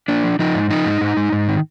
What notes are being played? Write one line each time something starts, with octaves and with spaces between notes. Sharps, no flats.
A#3 D4
F3
F3 D#4
G#2
F3 D#4
G#2
G#2
G#2
G#2
D#3